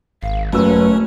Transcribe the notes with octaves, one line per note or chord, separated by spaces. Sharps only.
G#1 F5
F#1 A3 C#4 F#4 B4 E6